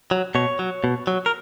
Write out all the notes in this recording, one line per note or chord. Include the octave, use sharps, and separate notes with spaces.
F#3
B2 C#5
F#3
B2
F#3
A#4